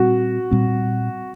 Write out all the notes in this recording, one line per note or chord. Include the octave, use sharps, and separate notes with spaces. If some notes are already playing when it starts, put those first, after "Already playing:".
Already playing: A#2 G3 C4 F#4
A#2 G3 C4